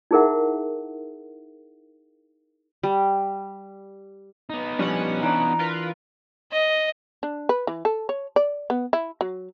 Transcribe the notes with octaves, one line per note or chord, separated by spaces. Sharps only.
D#4 E4 G#4 A#4 E5 F#5
G3
B3 D#4
F3 G3 C#4 D4 F#5
E3 D4 A#5
F4 A#4 B4
D#5
D4
B4
E3
A4
C#5
D5
B3
E4
F#3